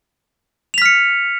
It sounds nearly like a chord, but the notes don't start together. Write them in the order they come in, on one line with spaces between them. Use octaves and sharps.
F7 B6 F6 C#7